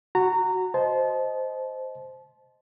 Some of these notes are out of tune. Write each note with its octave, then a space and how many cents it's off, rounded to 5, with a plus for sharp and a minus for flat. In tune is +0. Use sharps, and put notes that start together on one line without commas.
F#4 +0 A#5 -20
C5 -5 D#5 +0 A5 -30